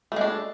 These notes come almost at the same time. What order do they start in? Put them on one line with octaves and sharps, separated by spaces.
A3 G#3 D4